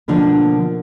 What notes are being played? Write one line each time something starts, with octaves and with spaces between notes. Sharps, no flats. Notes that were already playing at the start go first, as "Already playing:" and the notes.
B2 D3 F3 A#3 D4